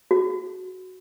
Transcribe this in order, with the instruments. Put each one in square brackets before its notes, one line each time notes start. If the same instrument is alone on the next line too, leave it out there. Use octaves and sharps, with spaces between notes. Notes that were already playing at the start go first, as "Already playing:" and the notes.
[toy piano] F#4